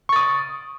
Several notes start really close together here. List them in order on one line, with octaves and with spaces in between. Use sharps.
C#6 A6 D#6